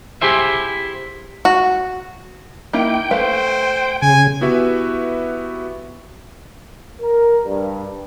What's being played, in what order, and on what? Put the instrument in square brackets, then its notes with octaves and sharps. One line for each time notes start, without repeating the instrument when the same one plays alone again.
[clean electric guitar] E4 G4 G#4 C5 E5
[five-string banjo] F#4
[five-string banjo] A#3 D#4 E4 [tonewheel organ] G5
[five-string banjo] A3 B4 F5 [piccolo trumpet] C5
[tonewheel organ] C#3 [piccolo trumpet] G#5
[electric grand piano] B3 E4 F#4 G4 B4 E5
[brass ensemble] A#4
G2